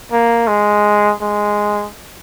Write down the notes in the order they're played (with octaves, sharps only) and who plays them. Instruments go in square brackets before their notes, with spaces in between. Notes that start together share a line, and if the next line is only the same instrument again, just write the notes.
[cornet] A#3
G#3
G#3